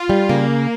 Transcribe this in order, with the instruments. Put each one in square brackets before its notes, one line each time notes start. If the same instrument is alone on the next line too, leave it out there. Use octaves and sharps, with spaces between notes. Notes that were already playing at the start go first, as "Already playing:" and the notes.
Already playing: [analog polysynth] F4
[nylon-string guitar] G3
[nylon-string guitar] C#3 [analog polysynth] A#3